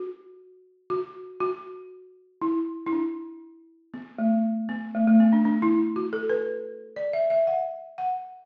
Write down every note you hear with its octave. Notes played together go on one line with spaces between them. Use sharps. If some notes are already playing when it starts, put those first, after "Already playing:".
Already playing: F#4
F#4
F#4
E4
E4
D4
B3
A3
B3
A3
A3
B3
D4
D4
E4
F#4
A4
B4
D5
E5
E5
F#5
F#5